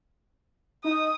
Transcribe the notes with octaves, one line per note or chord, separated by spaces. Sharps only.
D#4 D#6